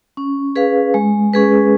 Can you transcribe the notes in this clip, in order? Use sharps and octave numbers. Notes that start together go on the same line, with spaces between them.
C#4
G#4 B4 F5
G#3
C#4 G#4 B4